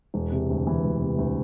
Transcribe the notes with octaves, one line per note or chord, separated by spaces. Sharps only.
E1
C3
D2
E3
E1
C3
D2